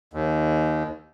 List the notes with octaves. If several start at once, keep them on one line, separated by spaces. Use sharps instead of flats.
D#2